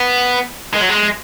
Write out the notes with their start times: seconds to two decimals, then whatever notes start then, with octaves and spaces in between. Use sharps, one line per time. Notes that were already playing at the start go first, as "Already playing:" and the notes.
Already playing: B3
0.73 G#3
0.80 F#3
0.89 G#3